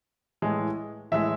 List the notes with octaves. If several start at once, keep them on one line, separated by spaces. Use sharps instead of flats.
A2 E3 G#3
A2 E3 G#3 E5